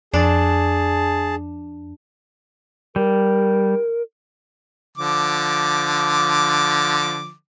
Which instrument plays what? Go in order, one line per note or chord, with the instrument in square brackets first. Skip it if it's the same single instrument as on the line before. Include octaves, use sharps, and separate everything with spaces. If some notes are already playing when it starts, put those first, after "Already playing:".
[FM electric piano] F2 [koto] D4 [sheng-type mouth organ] G#4 A5
[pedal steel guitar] G3 [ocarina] A#4
[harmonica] D3 F3 D6